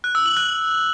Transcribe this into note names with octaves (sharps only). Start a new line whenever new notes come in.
F#6
E6
F#7
F#6